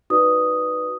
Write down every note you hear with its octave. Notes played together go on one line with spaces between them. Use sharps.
D#4 F#4 B4 D5 D#6